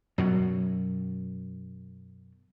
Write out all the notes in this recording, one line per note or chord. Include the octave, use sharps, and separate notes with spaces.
F#2 B2 F#3